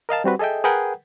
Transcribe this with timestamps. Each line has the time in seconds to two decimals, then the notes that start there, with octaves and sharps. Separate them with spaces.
0.09 A#4 D#5 F5 A5
0.24 G3 C4 F#4 B4
0.39 G#4 A4 D#5 E5 G5
0.64 G#4 A#4 B4 F#5 G5